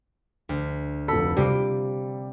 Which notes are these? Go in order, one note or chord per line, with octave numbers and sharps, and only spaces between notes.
D2
F1 A4 B5
C3 G3 F4 D6